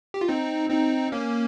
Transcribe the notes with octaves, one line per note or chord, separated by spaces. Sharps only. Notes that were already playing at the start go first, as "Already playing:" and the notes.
G4
F4
C4 D#4
C4 D#4
A#3 C#4